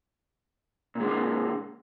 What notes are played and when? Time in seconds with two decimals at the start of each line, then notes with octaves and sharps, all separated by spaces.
0.95 A#2
1.00 G#3
1.04 D3
1.09 A#3